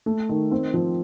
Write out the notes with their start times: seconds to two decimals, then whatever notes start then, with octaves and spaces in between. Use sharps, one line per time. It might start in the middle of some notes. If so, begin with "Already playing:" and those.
0.06 A3
0.29 D#3
0.51 C4
0.74 F3